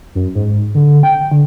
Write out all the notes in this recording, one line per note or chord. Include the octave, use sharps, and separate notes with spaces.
F#2
G#2
D3
G5
D3